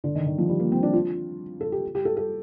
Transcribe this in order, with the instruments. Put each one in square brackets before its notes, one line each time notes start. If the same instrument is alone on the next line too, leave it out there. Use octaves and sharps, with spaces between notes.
[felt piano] D3
D#3
D#3
F3
G3
A#3
C4
D4
F4
A4
G4
G4
A4
A4